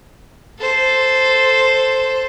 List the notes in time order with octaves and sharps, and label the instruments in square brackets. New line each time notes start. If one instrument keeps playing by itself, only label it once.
[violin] A4 C5